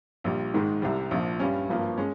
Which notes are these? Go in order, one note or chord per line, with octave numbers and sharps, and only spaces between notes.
A#1 A#2 G3
G#2 D#3 G#3
C2 C3 G3
A#1 A#2 F3
G2 G3 C#4
G#1 G2 F3 A#3
G#3 C#4